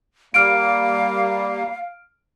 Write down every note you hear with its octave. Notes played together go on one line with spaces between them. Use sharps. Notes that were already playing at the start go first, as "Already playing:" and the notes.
G3 A#3 F5 F6 D7